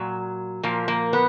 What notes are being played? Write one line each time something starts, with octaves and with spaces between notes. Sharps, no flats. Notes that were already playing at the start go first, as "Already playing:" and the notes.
Already playing: A#2 F#3
A#2 F3 A#3
A#3
B3